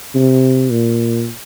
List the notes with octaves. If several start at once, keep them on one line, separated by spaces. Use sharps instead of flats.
C3
A#2